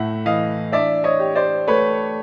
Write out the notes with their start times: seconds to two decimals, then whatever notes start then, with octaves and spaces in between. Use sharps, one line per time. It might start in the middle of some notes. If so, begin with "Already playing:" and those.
Already playing: A2 A3 E5 F#5
0.25 E3 D#5 F5
0.72 D4 D5 E5
1.04 C#5 D#5
1.20 G4
1.35 C5 D5
1.68 A3 B4 C#5